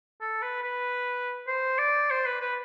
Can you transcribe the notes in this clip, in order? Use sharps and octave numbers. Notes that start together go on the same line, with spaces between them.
A4
B4
B4
C5
D5
C5
B4
B4